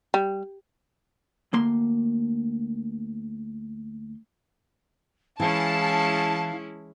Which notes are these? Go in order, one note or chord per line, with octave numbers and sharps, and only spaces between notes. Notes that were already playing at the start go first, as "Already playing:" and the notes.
G3
D2 A#3 C6
E3 G#3 C#4 E4 F5 A5